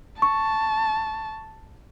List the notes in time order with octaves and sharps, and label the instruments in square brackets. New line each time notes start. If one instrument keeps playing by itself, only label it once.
[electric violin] A5 [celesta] C#6